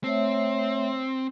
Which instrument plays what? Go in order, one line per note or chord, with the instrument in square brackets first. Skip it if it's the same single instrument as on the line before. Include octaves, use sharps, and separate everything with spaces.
[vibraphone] A3 C#5 E5 [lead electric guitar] C4